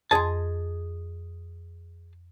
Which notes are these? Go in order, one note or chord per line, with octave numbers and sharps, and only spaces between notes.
F2 G#4 D#5 A5 C6